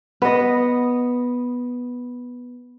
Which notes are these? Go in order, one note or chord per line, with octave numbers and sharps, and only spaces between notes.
B3 D#5